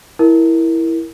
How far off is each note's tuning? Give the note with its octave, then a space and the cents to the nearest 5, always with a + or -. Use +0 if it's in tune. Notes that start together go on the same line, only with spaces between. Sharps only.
E4 +0 A#4 +5